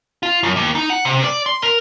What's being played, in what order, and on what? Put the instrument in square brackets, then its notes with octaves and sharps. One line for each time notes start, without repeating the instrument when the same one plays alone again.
[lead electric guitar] F4
F#2
D#2
D#4
F#5
C3
D5
C6
A#4